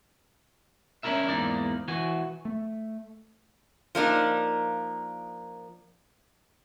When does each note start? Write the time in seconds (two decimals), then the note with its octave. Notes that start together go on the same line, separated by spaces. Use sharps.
1.03 C#4 D4 E4 F4 A#4 E5
1.28 E2 G#2 A#3 D#4 D5
1.88 E3 F#4 G#5
2.45 A3
3.95 F3 A#3 D4 D#4